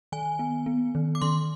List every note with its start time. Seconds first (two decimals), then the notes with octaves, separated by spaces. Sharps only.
0.12 D#3 G#5
0.39 B3
0.66 B3
0.95 D#3
1.15 D6
1.22 D#3 C6